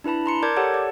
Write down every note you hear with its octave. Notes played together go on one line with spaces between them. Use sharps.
D4 E4 B4 A5 B5
A#5 C6 C#7
A#4 D5 A5 D6 G6 G#6
G4 A4 C#5 D5 F#5 A5
D5